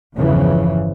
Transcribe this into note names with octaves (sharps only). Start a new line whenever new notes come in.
G1 E2 C#3 E3 F3